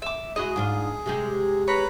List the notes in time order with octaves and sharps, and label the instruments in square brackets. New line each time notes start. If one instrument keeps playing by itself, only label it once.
[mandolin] E5 D6
[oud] G#3 E4 F#4 [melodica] G#4 [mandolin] D#5
[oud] G#2 D4 F4
C3 G#3 G4
[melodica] B4 A#5 B5 [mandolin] C#5